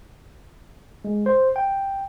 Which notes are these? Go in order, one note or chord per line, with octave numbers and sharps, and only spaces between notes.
G#3
C5
G5